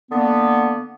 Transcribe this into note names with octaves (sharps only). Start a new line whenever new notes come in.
D3 A#3 B3